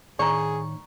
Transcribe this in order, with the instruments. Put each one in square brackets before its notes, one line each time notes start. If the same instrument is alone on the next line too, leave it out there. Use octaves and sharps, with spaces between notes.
[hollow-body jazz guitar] A2 D#3 [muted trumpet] G#4 [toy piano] D5 A#5 [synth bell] C#6